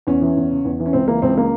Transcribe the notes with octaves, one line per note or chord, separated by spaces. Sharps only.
E2 C#4
E3
E2
C#3
E2
E3
C#4
C#2 C4
E3 A#3
C#2 C4
C#3 A#3